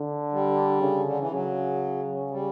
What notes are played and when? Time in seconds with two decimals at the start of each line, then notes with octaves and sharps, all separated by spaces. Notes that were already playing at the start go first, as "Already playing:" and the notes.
Already playing: D3
0.32 G3
0.81 C#3
1.04 D3
1.18 E3
1.31 C#3 F#3
2.31 G3